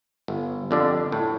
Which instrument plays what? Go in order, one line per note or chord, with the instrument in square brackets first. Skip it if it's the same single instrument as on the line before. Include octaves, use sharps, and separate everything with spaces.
[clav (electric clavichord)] G1
F2 D3 G3 D4
A2